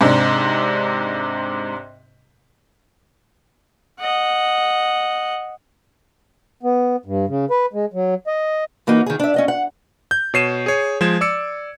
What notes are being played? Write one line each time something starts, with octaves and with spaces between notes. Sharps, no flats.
G#2 C3 D4
D#5 F#5
B3
G2
C#3
B4
G#3
F#3
D#5
E3 A#3 C#4 D#4 F#4
D#3 G#4
D4 E5
C#4 D#5 F#5
F#5
G6
B2 C#5 C7 D#7 E7
G#4 C#5
F3 G#3 C5 G#6 E7
D5 D6 E6 C#7